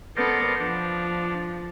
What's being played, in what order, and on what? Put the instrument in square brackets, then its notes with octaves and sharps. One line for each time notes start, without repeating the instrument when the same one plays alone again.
[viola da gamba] B3 A4 [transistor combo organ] A#4 C5 D5
[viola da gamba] F3 [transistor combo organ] D4